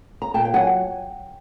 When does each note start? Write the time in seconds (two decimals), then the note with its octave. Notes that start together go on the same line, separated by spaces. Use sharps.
0.22 A#5
0.34 A#2 G5 A5
0.45 G5
0.54 F#3 F#5 G#5